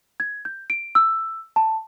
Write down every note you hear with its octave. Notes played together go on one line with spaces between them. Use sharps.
G#6
G6
D7
E6
A5